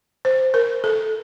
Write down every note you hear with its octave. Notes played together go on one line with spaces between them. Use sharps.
C5
A#4
A4